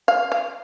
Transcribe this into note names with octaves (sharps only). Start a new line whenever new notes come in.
F5
F5